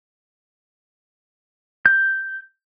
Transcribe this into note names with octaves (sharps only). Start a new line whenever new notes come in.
G6